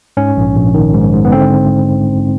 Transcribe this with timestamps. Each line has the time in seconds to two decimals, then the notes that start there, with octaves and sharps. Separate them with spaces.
0.17 G#2 C#4
0.37 A#1
0.56 A#1
0.74 D#3
0.94 G#2
1.13 G#2
1.25 B3
1.32 D3 C4